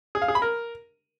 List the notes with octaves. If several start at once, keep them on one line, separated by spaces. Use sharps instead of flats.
G#4
F5
G#4
B5
A#4